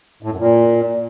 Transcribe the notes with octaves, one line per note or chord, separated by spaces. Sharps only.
A2
F#2
A#2